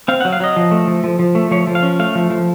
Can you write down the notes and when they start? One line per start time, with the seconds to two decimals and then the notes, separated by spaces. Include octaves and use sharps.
0.08 C4 F5
0.21 F#5
0.25 F#3
0.33 F5
0.40 F#3 D#5
0.56 F3
0.71 A3
0.87 F3
1.04 F3
1.19 F3
1.35 A3
1.51 F3 C#5
1.67 F3
1.75 F5
1.83 C#4
1.99 A3 F5
2.15 F3
2.30 F3